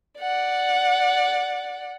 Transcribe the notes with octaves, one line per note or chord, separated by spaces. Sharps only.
D5 F#5